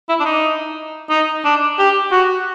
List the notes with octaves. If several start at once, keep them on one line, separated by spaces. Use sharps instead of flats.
E4
D4
D#4
D#4
D4
G4
F#4